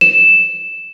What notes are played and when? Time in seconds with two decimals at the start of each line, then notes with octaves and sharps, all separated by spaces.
0.01 E7